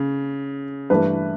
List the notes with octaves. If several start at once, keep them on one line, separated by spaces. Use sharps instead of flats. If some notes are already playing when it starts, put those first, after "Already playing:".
Already playing: C#3
G2 E3 A3 B4